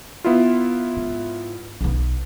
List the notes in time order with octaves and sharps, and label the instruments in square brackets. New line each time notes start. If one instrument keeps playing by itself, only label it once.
[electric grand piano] B3 E4 F4
[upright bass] G#2
B1 B3